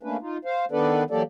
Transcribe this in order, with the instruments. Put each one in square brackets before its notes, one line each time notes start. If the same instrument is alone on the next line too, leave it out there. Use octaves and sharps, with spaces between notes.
[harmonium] A3 A#3 C#4 D4 B4
D#4 F4
C5 F5
D#3 B3 D4 A4 B4 D5
E3 F#3 A#3 G4 A4 D5